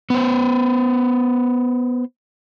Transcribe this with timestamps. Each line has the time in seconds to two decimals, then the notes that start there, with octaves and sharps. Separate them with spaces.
0.10 B3 C5